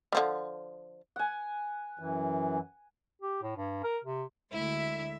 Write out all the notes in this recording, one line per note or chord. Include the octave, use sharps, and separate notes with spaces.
D3 F3 G3
F#5 G#5
F#2 E3
G4
A2
G2
A#4
C3
D2 D3 G#3 E4 E5